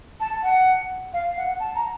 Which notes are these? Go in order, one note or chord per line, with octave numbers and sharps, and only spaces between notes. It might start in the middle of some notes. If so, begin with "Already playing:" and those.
A5
F#5
F5
F#5
A5
A#5